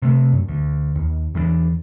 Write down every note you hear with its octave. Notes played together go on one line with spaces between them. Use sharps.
C3 A3
F#2
D2
D#2
E2 E3 F#3 D4